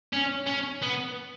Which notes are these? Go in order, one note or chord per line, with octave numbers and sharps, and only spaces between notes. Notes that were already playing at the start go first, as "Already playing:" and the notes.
C#4
C#4
B3